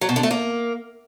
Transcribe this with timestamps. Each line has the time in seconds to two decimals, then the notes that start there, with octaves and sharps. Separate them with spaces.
0.01 F#3
0.09 B2
0.16 D3
0.23 A3
0.31 A#3